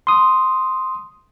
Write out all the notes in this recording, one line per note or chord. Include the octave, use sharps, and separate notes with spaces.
C6 D#6